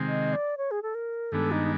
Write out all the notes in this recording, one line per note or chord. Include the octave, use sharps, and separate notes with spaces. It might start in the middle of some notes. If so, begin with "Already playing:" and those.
Already playing: C3 D#3 G#3 C4
D#5
D5
C#5
G#4
A4
A#4
G2 D#3 G#3 B3 D4 A4
D#4